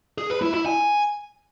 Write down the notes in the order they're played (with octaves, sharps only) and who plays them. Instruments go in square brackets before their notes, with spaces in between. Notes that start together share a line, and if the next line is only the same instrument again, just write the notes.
[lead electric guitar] G#4
B4
E4
E4
G#5